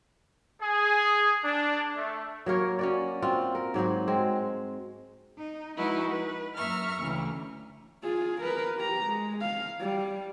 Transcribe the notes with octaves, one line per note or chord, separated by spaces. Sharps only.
G#4
D4
A3
F#3 A#3 A#4 C#5
C#4 F#4 D5
C4 F4 F#4
A#4
G#2 F#3 F#4 C5
G#3 C4
D#4
F3 G#3 D#4 E4 F#4 B4
B4
F#2 A#3 E5 A#5 C#6 F6
D2 C#3 E3
F4 G#4
A#4 B4
G4 A#5
G#3
F5
G3